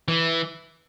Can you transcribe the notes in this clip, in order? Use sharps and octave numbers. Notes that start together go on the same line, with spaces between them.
E3